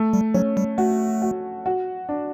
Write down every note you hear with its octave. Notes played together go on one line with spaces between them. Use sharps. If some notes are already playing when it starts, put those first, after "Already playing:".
Already playing: A3
G3
F#3 C#4
G3
A3 F#4
F#4
F#4
D4